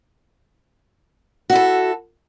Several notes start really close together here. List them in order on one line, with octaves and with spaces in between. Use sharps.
F#4 E4 A4